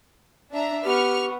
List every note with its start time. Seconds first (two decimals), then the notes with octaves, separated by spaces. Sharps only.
0.53 D4 E5 A#5
0.84 B3 G4 C#6 F6